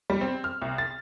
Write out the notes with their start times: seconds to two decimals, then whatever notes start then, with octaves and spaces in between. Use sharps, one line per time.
0.10 G3
0.21 C4
0.44 F6
0.62 C2
0.78 A6